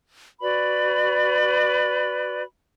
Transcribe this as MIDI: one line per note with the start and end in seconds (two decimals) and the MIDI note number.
0.41 2.42 66
0.41 2.42 71
0.41 2.42 74
0.41 2.42 83